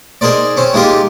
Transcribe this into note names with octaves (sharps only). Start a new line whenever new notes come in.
D#4 G#4 A#4 C5 D5
C4 C#4 C5
G#3 A#3 D#4 F4 G4 A#4